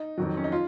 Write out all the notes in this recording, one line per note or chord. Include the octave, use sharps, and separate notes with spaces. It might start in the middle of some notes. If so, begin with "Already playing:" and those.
Already playing: D#4
F2 D#3 F#3
C#4
D#4
F4